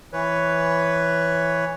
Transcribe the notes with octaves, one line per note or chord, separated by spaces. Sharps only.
E3 B4 C#5